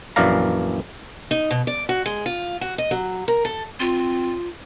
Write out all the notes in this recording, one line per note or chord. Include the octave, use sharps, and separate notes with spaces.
A#1 F#2 E3 D5 F5 A#5
D#4
B2
D5
F#4
G#3
F4
F#4
D#5
F#3
A#4
A4
C4 F4